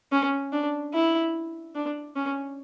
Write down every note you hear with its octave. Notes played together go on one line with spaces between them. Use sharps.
C#4
D4
E4
D4
C#4